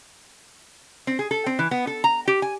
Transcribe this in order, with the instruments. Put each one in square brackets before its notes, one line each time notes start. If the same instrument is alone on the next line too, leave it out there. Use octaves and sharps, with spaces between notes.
[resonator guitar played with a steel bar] C4
G#4
A4
C4
E3
B3
A4
A#5
G4
G#5